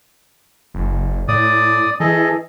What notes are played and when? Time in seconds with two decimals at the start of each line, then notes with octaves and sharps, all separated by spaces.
0.74 F#1
1.28 A2 D5 D#6
2.00 E3 G#4 A4 D#5